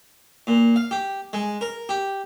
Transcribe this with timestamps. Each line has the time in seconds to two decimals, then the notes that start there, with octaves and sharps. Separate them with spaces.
0.47 A#2
0.76 F5
0.91 G4
1.33 G#3
1.61 A#4
1.89 G4